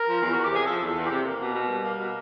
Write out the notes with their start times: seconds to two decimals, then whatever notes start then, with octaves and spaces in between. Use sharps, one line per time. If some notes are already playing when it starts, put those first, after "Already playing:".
Already playing: A#4
0.08 F3
0.22 E2
0.33 E2 F#4
0.44 G4
0.52 C3 G#4
0.66 F3 A4
0.82 E2 A4
0.96 E2
1.06 C3 G4
1.26 A#3
1.41 B2
1.55 B2
1.69 G3
1.84 A#3
2.00 B2